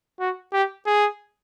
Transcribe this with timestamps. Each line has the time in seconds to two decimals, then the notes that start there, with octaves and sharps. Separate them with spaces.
0.20 F#4
0.53 G4
0.86 G#4